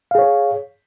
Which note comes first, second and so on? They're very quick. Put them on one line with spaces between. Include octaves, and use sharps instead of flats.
F5 G#4 C#5